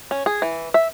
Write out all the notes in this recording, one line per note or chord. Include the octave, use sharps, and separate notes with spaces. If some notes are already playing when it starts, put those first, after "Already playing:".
C#4
G#4
E3
E5